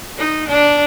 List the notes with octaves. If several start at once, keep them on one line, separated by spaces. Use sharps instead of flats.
D#4
D4